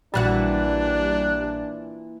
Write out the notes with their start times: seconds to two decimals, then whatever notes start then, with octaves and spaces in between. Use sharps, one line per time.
0.14 A#1 A#2 E3 G3 D4 F#4 F#6 A6